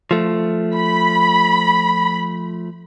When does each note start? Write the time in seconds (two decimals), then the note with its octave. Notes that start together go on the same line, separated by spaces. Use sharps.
0.11 F3 A3
0.74 B5